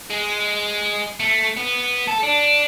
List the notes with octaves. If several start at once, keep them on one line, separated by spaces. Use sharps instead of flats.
G#3
A3
B3
A4
D4